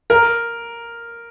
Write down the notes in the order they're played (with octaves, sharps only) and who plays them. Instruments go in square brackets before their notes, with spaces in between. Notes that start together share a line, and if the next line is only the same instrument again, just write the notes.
[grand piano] A#4